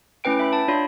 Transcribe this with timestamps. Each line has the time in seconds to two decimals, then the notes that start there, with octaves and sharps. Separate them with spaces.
0.24 A3 C#4 E4 B4 G5 D7
0.39 E5 B5
0.52 G5 A5
0.68 D4 F4 C#5 B5